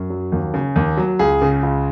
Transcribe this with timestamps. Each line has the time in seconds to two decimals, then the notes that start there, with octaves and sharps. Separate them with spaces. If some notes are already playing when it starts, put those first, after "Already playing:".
Already playing: F#2
0.10 F#3
0.32 D#2
0.54 C#3
0.76 D#2
0.97 F#3
1.19 C#2 G#4
1.41 C#3
1.63 C#2